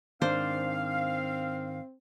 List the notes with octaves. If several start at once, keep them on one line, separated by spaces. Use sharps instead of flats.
G#2 D#3 C4 D4 C5 F5